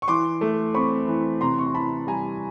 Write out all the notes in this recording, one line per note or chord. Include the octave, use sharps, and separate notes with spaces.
C#6
E3 C6 D6
A3
C4 B5 C#6
E3
C3 A#5 C6
C#6
C6
E3 A5 B5
G3 G#5 A#5